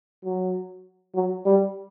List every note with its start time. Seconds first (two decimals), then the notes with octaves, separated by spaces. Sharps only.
0.25 F#3
1.15 F#3
1.46 G3